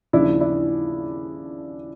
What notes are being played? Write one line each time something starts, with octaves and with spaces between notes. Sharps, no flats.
D#2 C#3 F3 D4 E4
D4 E4